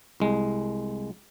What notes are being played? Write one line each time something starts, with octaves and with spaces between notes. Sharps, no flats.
C2 G#3